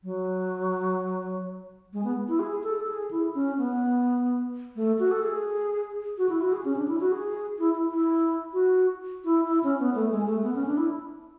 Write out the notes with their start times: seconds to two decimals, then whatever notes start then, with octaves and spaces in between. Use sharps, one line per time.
0.04 F#3
1.93 G#3
2.04 B3
2.28 E4
2.40 G#4
2.64 A4
2.87 G#4
3.11 E4
3.35 C#4
3.58 B3
4.76 A3
4.99 F#4
5.11 A4
5.23 G#4
6.18 F#4
6.29 E4
6.41 F#4
6.53 G#4
6.65 C#4
6.76 D4
6.88 E4
7.00 F#4
7.12 G#4
7.59 E4
7.75 E4
7.90 E4
8.53 F#4
9.24 E4
9.48 E4
9.64 C#4
9.79 B3
9.95 A3
10.11 G#3
10.26 A3
10.43 B3
10.55 C#4
10.66 D4
10.78 E4